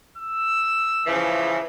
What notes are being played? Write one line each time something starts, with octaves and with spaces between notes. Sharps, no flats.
E6
C#3 E3 F3